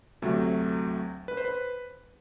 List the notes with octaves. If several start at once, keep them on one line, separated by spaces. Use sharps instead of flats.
D2 C3 F#3 A3
B4
C5
B4